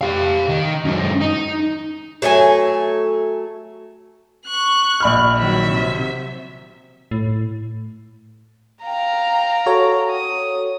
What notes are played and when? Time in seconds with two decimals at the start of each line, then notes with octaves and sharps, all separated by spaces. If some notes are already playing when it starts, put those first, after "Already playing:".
0.01 G4 F5
0.49 D#3
0.85 F#2 G#3
1.21 D#4
2.22 F#3 A3 A4 G#5
4.46 C#6 F#6
5.00 A#1 B5 F6
5.38 D#3 F#3 E5
5.72 C3
7.11 A2
8.84 F5 G5 A#5
9.66 F#4 A4 C#5
10.11 D#6